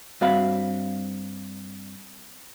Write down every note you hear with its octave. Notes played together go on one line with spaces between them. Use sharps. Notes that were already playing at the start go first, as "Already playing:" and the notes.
G2 C4 F#4 E5 F5 B5